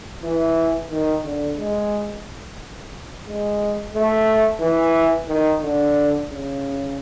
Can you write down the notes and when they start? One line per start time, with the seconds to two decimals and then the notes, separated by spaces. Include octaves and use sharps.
0.23 E3
0.91 D#3
1.24 D3
1.57 G#3
3.26 G#3
3.94 A3
4.60 E3
5.28 D#3
5.61 D3
6.30 C#3